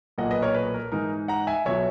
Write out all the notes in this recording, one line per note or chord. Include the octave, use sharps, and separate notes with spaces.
B1 A#2 A#3 D#5 F#5
B4 D#5
A#4 C#5
B4
A#4
G#2 E3 G#3 D#4 A#4
F#5 A#5
E5 G#5
B1 B2 F#3 C#5 E5